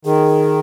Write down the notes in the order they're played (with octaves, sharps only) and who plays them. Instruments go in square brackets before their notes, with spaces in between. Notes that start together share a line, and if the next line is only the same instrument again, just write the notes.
[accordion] D#3 [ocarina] G#4